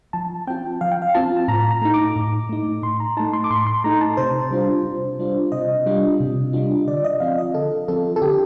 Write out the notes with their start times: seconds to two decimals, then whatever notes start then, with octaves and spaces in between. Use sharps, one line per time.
0.13 F3 A5
0.47 C4 F4 G5
0.81 F3 F5
0.92 G5
1.02 F5
1.15 C4 F4 A5
1.37 A5
1.48 A2 A#5
1.71 A#5
1.82 A3 D#4
1.94 D6
2.16 A2
2.49 A3 D#4
2.83 A2 C6
3.00 A#5
3.17 A3 D#4 A5
3.33 C6
3.44 D6
3.50 A2 C6
3.67 C6
3.84 A3 D#4 A#5
4.01 A5
4.17 C3 C5
4.51 G3 D4 F4
4.85 C3
5.19 G3 D4 F4
5.52 C3 D#5
5.86 G3 D4 F4
6.20 C3
6.53 G3 D4 F4
6.88 D3 D5
7.04 D#5
7.20 F3 C4 F4 F5
7.38 D#5
7.54 D3 A4
7.88 F3 C4 F4 A4
8.16 A4
8.22 D3 G4